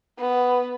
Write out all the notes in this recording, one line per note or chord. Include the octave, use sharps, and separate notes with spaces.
B3